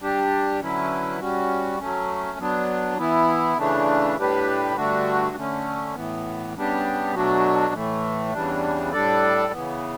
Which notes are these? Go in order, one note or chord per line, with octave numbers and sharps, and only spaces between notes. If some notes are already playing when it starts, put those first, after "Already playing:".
G3 D4 G4
D3 F#3 C#4 E4 B4
G3 C#4 F#4
F#3 A3 C#4
F#3 B3 D4
E3 B3 E4
C#3 E3 A3 D4
A2 G3 D4 G4 B4
G2 D3 A3 D4 F#4
D3 A3 C#4
A2 E3 B3
C#3 G3 B3 D4 G4
B2 F#3 A3 D4 F#4
A2 E3 A3
E2 C#3 E3 G3 D4
A2 G3 D4 A4 D5
C#3 E3 B3